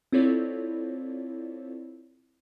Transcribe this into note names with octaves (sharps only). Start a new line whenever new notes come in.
C4 E4 F4 A4 C#5 D5